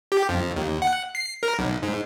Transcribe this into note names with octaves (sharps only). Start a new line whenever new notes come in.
G4
F2
D#2
F#5
C7
A#4
B1
G#2